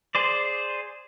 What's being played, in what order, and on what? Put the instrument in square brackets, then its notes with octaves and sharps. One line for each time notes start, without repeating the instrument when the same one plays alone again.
[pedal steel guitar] G#4 C5 D5